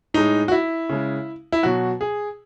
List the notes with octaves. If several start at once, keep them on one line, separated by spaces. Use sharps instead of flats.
A2 G#3 D#4
F#4
E4
C#3 G#3
E4
B2 F#3 F#4
G#4